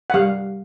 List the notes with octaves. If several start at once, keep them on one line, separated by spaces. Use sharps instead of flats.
F#5
G3 F5